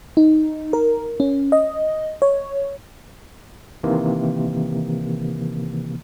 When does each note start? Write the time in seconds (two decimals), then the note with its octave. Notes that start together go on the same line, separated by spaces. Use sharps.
0.17 D#4
0.73 A#4
1.20 C#4
1.52 D#5
2.22 C#5
3.83 C3 D#3 E3 A#3